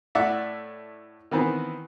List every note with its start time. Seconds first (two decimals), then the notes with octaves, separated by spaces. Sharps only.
0.15 A2 D5 E5 F#5
1.31 D#3 E3 B3 C4